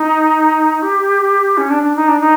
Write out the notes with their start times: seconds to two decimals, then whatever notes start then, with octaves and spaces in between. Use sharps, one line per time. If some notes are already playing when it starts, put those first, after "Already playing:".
Already playing: D#4
0.82 G4
1.58 C#4
1.70 D4
1.83 D4
1.96 D#4
2.08 D4
2.20 D#4